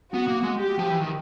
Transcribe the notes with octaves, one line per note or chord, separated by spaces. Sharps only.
B3 F#4
A#3
G#3
G4
F3
E3
D#3